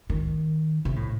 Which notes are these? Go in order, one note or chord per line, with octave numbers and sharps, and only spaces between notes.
D#3
C3
A2